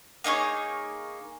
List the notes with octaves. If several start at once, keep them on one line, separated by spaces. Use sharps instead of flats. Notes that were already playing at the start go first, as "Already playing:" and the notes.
A#3 D#4 G#4 C#5